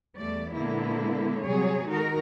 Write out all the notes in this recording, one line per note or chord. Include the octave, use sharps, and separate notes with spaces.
E2 G3 A3 D5
A#2 D3 G#3 A#3 B3 E4
C3 F#3 G3 G#4 C#5
D#3 G#3 D#4 F#4 A#4